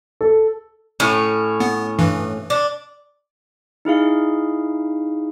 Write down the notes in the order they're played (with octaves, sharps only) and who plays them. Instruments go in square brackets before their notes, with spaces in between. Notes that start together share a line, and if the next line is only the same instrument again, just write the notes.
[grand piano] A4
[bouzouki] A2 C#4
[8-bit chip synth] B3
G2 E3
[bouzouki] D4
[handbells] D#4 E4 G#4 F5